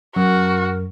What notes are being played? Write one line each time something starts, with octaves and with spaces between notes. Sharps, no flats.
F#2 F#4 A#4